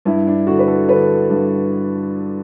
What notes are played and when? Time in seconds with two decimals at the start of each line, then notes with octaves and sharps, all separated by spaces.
0.05 G2 E4
0.27 D4
0.47 D3 F#4
0.59 B4
0.68 A4
0.89 D3 B4
1.30 G2